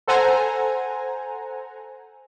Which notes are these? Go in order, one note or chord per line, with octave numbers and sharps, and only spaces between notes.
A4 C5 F#5 G#5 A#5